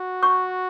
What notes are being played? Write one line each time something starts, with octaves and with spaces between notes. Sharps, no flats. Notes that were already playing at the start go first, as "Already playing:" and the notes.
Already playing: F#4
C#6